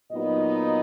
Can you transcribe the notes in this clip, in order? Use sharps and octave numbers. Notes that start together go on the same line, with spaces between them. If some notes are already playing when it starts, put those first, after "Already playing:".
A#2 F#3 B3 D#4 D#5